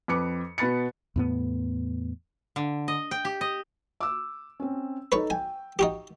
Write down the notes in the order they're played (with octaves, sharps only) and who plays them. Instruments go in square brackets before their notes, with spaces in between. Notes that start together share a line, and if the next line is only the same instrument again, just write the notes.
[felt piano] F2 B4 D6 C#7
B2 B3 B5 A6 C#7
[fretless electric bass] E2 A2 B3
[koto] D3
D#5
G5
G4
D#5
[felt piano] D6 E6
C4 C#4
[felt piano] D#4 A4 [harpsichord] B4 C#5 C#6
[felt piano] G5 [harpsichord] G#5
[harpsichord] D#4 F#4 G4